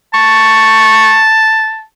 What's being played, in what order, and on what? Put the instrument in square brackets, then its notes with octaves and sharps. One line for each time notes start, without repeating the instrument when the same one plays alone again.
[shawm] A5 [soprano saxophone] C#6